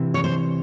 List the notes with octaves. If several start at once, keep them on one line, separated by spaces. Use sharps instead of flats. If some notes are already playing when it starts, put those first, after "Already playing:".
Already playing: C3 E3
C#5
C5